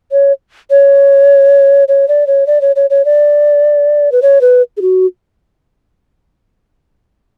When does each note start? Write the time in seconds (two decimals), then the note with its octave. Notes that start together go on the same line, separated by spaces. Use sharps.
0.12 C#5
0.70 C#5
1.88 C#5
2.08 D5
2.27 C#5
2.47 D5
2.61 C#5
2.76 C#5
2.90 C#5
3.05 D5
4.12 B4
4.22 C#5
4.41 B4
4.77 G#4
4.82 F#4